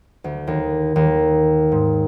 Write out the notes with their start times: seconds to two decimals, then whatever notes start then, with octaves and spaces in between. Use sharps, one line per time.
0.24 D2
0.47 D#2
0.96 D#2
1.72 G#2